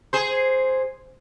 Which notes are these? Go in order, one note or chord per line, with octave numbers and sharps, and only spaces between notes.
G#4 C5